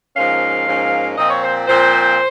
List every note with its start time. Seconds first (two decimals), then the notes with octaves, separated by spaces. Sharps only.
0.16 G#2 F3 A#3 C#4 F5
0.66 G#2 F3 A#3 C#4
1.17 A#2 F3 C4 D#5
1.30 C#5
1.42 C5
1.67 A#2 F3 C4 C5